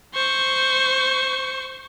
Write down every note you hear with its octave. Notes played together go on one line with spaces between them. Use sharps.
C5 C#6